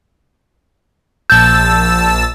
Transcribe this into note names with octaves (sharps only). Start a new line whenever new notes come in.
A#1 A5 E6 G6